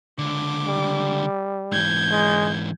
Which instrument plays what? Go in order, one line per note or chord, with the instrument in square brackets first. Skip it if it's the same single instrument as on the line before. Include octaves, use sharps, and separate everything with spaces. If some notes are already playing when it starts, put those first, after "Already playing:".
[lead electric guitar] C#2 D3 [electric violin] D6
[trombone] G3
[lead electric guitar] G#2 E3 [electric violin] G6 G#6
[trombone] G#3